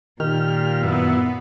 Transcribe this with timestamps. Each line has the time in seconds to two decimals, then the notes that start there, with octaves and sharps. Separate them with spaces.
0.20 A#2 D#3 G4 F6
0.83 F#2 B3 E4